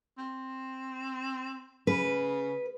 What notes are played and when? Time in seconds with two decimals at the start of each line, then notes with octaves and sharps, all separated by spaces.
0.18 C4
1.87 C#3 B4